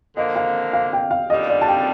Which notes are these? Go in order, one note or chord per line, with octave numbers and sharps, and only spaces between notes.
D3 F3 A#3 D#5
F5
F5
G5
F5
D#2 D3 G3 D4 F4 D#5
D5
A5
G5